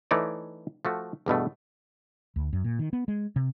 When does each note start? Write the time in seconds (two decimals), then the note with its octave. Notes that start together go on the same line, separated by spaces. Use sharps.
0.11 E3 A3 D#4 C#5 D5
0.85 F3 A3 F#4
1.26 E2 G2 B2 A3
2.36 D2
2.53 F#2
2.64 A#2
2.79 D#3
2.93 B3
3.08 G#3
3.36 C3